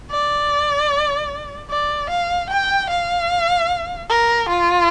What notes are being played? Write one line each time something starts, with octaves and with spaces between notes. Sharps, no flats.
D5
D5
F5
G5
F5
A#4
F4